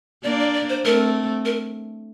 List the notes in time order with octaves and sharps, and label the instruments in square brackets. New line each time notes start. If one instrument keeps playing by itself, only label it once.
[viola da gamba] A#3 D4 [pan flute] D5
[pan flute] D5
D5
C5
[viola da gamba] A3 C4 [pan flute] A#4
[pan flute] A#4